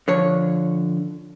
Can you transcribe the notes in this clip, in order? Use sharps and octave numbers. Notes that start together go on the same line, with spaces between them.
D3 F3 C#5